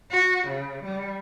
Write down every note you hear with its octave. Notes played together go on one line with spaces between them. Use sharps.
F#4
C#3
G3